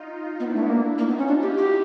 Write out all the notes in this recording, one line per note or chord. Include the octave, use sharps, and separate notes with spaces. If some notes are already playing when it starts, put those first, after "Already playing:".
Already playing: D#4 F4
B3 D4 E4
A3
B3
A#3
A#3 D#4 F4
B3
C#4
D4 E4 F#4
G4
G4